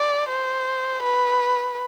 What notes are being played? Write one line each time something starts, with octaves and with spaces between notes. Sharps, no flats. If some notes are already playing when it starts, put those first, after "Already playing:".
Already playing: D5
C5
B4